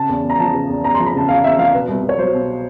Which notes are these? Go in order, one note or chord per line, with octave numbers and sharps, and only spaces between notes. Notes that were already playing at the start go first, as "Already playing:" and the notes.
Already playing: C#3 A5
E2
E2
A#5
F3 A5
C#3
E2
E2 A#5
F3 C6
B5
C#3 A5
E2 F5
E2 E5
F3 F5
B2 B4
C2
C2
C#5
F#3 C5
B2